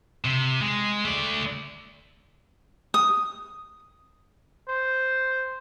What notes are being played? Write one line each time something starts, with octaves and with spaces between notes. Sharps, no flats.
C3
G#3
A3 D5
D#6
C5